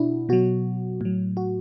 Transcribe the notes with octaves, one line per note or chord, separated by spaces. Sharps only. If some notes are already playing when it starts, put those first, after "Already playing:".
Already playing: B2 D4 E4 F#4
B2 F#3 F#4
A2 F#3
F#4